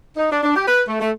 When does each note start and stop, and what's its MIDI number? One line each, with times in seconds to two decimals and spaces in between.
0.17 0.30 63
0.31 0.39 62
0.43 0.56 62
0.56 0.65 67
0.68 0.82 71
0.88 0.98 57
1.00 1.11 57